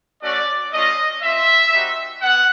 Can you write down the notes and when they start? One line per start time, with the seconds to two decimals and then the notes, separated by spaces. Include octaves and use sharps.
0.22 A3 C#4 F#4 D5
0.72 A3 C#4 F4 D#5
1.22 C4 F4 E5
1.72 G3 C4 D#4 F#4
2.22 B3 F#5